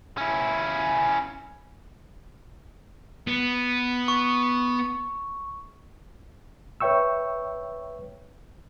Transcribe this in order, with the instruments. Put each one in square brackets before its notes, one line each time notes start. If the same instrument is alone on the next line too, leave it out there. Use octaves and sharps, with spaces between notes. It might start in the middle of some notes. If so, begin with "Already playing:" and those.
[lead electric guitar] C#4 E4
[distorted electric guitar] B3
[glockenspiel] C#6
[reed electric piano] B4 C#5 E5 G5 C#6 E6